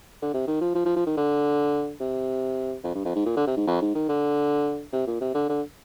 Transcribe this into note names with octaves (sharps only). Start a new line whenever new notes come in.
D3
C3
D#3
F3
F3
F3
F3
D#3
D3
C3
F2
G2
F2
G#2
A#2
D3
C3
G#2
F2
G#2
D#3
D3
C3
A#2
C3
D3
D3